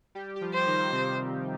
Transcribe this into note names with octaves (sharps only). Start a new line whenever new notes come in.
G3 G4
G4
F3 F4
C5
D#3 D#4
C3 C4